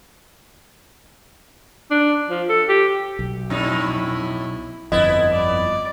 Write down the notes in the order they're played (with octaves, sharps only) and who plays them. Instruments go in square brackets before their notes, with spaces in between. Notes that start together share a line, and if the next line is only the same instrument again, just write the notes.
[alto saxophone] D4
F3
A4
G4
[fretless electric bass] B1
[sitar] F2 A2 D#4 [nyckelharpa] E4
[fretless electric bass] G1 F2 [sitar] B3 E4 [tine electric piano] D#5
[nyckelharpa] D5